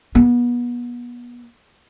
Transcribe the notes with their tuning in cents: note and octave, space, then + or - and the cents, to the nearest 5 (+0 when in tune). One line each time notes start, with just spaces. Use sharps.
B3 -30